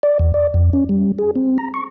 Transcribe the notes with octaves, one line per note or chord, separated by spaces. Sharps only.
D5
E2
D5
F2
C#4
G3
G#4
C4
A#5
C#6